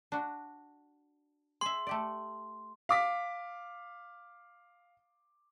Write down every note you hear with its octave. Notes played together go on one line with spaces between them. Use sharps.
D4 F#4
G#4 E5 C6
A3 G4 D5
F5 D6 B6